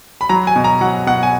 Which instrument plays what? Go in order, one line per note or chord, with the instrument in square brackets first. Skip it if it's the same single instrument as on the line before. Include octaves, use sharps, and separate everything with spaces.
[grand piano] B5
F#3 A#5
G#5
B2
A#5
F#3 F#5
B2 F#5
G#5